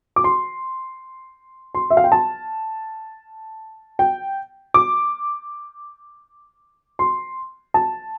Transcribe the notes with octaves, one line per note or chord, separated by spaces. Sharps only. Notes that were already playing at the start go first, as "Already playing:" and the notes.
D6
C6
C6
E5
F5
G5
A5
G5
D6
C6
A5